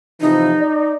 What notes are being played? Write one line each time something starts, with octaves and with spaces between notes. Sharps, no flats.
C3 E3 F3 D#4
D5